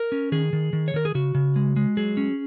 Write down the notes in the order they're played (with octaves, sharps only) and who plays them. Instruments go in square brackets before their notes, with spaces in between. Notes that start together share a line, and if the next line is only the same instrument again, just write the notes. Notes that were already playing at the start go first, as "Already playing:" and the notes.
Already playing: [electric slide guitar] A#4
C#4
D#3 G#4
D#3
D#3
C#5
D#3 A#4
G#4
C#3 F#4
C#3
G#3
G#3
F#3 G#4
C#4